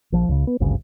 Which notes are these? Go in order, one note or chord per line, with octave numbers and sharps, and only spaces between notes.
A#1 F3
C#2 C#3
B3
G#1 D2 G2 C#3